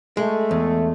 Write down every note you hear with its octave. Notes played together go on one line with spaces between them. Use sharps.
G#3 A3
E2